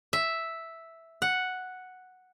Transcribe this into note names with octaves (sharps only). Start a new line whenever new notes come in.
E5
F#5